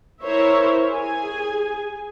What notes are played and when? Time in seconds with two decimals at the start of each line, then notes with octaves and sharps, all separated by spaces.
0.22 E4 A#4 C5 C#5 E5
0.90 G#4 G#5